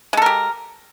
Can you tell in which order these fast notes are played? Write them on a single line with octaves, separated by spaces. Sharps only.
G#3 A4 A#4 G4